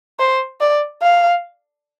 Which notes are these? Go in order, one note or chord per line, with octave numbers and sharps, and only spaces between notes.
C5
D5
F5